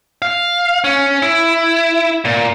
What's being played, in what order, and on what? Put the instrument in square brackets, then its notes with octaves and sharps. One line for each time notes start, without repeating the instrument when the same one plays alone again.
[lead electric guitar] F5
C#4
E4
A#2